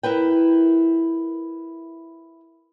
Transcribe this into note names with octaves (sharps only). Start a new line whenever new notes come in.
E4 A#4 B4 G5